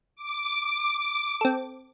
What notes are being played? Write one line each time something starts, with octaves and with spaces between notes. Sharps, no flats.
D6
C4 A4